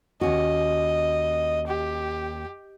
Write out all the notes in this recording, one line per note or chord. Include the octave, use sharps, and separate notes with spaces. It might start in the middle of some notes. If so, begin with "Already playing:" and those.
D#2 C#4 F#4 D#5
G4